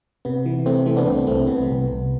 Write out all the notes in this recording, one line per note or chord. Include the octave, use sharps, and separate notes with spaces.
C3 B3
E3
C3 A3 C4
E3 A3 C4
B3 D4
C2 A3 C4
C2 A3 C4
C3 B3
C2
C2